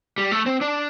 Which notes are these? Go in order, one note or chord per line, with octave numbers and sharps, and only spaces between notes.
G3
A3
C4
D4